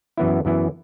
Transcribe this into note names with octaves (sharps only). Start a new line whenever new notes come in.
F#2 E3 B3 E4
F#2 E3 B3 E4